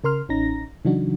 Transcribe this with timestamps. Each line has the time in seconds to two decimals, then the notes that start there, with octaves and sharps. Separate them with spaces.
0.04 C#3 A#4 C6 F6
0.29 A1 C#4 D#4 A#5 A#6
0.85 C#3 E3 F#3 D4 D#4 F#4